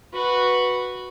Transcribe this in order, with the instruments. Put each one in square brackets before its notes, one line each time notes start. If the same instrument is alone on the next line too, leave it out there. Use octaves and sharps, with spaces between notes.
[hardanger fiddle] F#4 B4